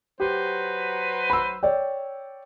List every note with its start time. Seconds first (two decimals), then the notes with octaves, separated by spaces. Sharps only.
0.20 F#3 G4 B4 C5
1.30 B5 E6
1.63 C#5 D5 G5